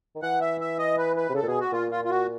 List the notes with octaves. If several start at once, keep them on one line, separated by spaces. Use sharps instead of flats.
D#3
E3 F#5
E5
E5
D#5
B4
B4
C3
C#3 A4
A#2
B2 G#4
F#4
A#2 F4
F4
F4
F#4